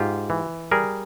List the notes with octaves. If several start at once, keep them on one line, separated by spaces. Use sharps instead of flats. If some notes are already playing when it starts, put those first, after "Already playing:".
Already playing: G#2 F4 G4
E3
G3 G#4 A#4